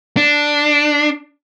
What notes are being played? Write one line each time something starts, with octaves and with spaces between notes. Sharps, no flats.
D4